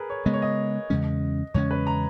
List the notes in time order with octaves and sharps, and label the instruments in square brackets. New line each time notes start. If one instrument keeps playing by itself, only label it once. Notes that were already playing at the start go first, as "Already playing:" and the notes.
Already playing: [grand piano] G#4 A#4 B4
C#5
[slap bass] C#3 G#3 B3 [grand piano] D#5
[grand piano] C#5
D#5
[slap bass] E2 C#3 G#3 C#4
[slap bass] E2 C#3 G#3 C#4 [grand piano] C#5
[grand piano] B4
A#5